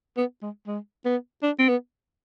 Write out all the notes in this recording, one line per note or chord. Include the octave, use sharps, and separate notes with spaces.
B3
G#3
G#3
B3
D4
C4
B3